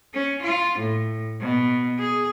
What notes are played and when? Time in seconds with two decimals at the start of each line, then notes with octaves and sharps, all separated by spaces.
0.14 C#4
0.43 F4
0.80 A2
1.41 B2
1.99 G#4